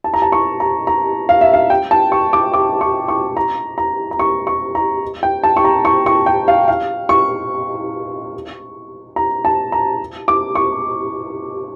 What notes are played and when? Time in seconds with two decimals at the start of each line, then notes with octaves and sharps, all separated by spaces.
0.04 A5
0.14 A#5
0.22 A5
0.32 C#6
0.60 A#5
0.87 A#5
1.29 F5
1.41 E5
1.53 F5
1.70 G5
1.91 A5
2.12 C#6
2.33 D6
2.53 D6
2.81 C#6
3.08 C#6
3.37 A#5
3.78 A#5
4.11 A#5
4.19 C#6
4.47 C#6
4.75 A#5
5.23 G5
5.44 A5
5.57 C#6
5.64 A#5
5.85 C#6
6.06 C#6
6.26 G5
6.48 F5
6.68 F5
7.09 C#6
9.16 A#5
9.45 A5
9.72 A#5
10.28 D6
10.55 C#6